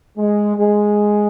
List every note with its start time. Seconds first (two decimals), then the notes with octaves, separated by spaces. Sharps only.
0.18 G#3
0.57 G#3